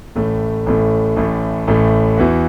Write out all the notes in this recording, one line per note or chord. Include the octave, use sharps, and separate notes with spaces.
A1 A2 A3
A1 A2 A3
A1 A2 A3
A1 A2 A3
E2 E3 B3 F#4